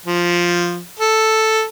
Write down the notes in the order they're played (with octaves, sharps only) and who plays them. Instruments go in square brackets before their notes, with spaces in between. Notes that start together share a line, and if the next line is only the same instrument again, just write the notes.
[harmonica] F3
A4